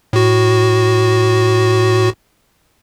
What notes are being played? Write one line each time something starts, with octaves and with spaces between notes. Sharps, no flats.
A2 F#4